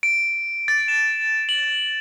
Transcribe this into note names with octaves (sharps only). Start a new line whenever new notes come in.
D7
A6
E7
F#7